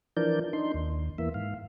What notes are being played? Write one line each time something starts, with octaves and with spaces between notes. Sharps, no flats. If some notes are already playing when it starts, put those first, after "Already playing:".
E3 F3 D4 A#4 D5 G6
D4 D#4 C6
D#2
E2 E3 A#3 E5
G#2 F5